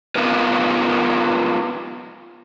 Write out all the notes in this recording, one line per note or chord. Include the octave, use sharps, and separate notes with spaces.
B3 D#4 F4 A#4 B4